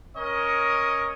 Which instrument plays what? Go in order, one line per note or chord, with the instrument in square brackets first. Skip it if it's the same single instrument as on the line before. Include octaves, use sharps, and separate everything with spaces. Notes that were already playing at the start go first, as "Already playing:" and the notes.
[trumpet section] C#4 A#4 C#5 D#5